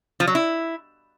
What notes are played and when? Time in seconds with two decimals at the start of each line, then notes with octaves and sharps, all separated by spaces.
0.20 F3
0.27 F#3
0.35 E4